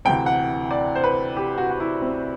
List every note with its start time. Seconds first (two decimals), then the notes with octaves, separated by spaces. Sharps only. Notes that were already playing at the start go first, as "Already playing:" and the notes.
0.05 D2 C3 E3 G5
0.26 F#5
0.71 D5
0.95 C5
1.04 B4
1.37 G4
1.58 F#4
1.70 F#4
1.80 E4
2.02 C4